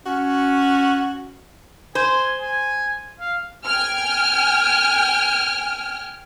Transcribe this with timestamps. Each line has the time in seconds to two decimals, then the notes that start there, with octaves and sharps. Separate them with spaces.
0.06 C#4 F#4
1.95 C5 G#5
2.41 G#5
3.20 F5
3.65 G5 G#5 F6